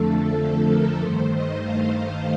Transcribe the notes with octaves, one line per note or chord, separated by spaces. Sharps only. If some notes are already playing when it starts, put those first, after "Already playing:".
Already playing: F2 D3 F3 A3 A4
A#4
G2 D#3 A3 C5
D#5
F5